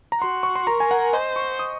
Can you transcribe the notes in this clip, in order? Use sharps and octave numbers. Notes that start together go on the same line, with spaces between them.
A#5
F#4 C6
C#6
C6
A#4 A#5
G#5
F#5
C5 D#5
C#6
D#6